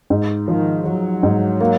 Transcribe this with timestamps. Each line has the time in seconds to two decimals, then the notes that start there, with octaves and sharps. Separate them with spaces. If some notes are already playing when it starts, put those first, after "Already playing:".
0.10 G#2
0.48 D#3 F3
0.85 F3 F#3
1.23 G#2
1.61 A#3